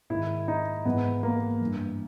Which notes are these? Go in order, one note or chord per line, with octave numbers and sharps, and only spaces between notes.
G#2 D#3 E4
D#4
G#2 E3 B3
A#3
G2 E3